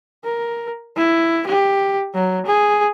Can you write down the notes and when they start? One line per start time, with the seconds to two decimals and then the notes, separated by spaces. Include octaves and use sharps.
0.25 A#4
0.97 E4
1.48 G4
2.15 F#3
2.47 G#4